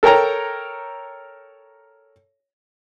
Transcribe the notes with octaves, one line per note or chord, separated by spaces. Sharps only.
A4 A#4 C#5 G5 A#5